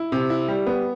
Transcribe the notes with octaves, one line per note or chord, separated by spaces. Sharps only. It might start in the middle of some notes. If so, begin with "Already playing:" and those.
Already playing: E4
C3
E4
G3
B3